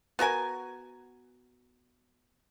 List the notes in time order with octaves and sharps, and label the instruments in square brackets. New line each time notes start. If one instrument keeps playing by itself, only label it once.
[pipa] B3 F#4 A#4 G#5